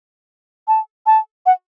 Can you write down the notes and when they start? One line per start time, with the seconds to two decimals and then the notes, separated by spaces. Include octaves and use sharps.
0.68 A5
1.06 A5
1.46 F#5